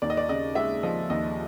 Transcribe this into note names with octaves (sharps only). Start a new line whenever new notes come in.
D#2 D5
D#5
D5
C#3 D#5
G#3 E5
F3 D#5
D#2 D#5